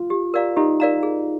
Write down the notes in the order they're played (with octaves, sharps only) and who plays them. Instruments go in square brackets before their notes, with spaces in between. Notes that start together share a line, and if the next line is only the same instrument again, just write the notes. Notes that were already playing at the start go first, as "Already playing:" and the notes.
Already playing: [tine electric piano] F4
[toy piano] G4
A#4 D5 F5 A#5
[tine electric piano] D#4 [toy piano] G4
[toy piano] A#4 D5 F5 A#5
G#4